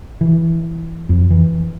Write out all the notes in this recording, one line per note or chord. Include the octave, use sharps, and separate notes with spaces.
E3
F2
E3